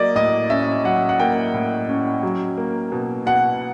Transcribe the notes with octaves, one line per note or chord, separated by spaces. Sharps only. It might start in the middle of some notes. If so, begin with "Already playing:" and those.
Already playing: F#3 A#3 D5 D#5
A2 D#5
C#4 E5
F#3 F#5
F#5
A#3 G5
A2
C#4
F#3
A#3
B2
B2 F#5